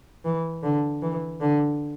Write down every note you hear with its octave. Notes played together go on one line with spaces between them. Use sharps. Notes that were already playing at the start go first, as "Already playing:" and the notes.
E3
D3
E3
D3